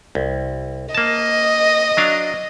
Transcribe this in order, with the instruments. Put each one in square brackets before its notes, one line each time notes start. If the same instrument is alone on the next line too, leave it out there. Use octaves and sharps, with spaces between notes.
[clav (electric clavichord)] C2
[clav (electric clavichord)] A#3 A5 [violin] D#5
[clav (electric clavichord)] F#3 D4 F5